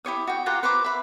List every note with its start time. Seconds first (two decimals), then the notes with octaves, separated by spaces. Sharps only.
0.05 E4 G4 C#5 D#6
0.27 F#4 G5
0.46 F4 G4 F#5 A#5
0.63 B4 C5 A#5 D6
0.84 E5 B5